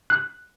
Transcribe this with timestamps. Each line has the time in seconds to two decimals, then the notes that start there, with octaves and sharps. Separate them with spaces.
0.10 F#6